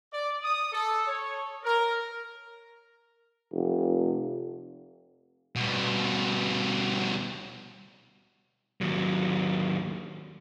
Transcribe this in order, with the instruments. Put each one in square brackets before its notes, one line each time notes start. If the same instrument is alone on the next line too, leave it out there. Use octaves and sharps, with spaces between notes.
[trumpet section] D5
D#6
A4
C#5
A#4
[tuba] F1
[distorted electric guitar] B2 G3
D#2 F#3